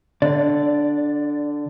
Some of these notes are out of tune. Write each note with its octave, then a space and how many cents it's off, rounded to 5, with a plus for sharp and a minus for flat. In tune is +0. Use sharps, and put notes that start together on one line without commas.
D3 +0 D5 +0